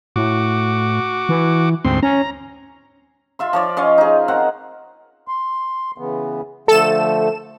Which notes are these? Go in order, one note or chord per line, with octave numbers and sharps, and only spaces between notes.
A2 F#4 D6
E3
D2 G#2 C4 C6
C#4 A#5
F4 E5 C6
F3 C#5 D5
C#4 C#5 D#5 F5
D#4 G#4
C4 A#4 F#5
C6
C#3 E3 B3
D3 F3 A3 A4 E7